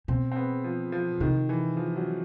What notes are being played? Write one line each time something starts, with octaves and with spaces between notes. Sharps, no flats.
B2 C4
C4
B3
F3
F3
C3 D#3
E3
F3
F#3